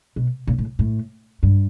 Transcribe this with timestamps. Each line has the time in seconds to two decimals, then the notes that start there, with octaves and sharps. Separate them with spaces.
0.16 B2
0.47 A#2
0.58 A2
0.79 A2
1.43 G2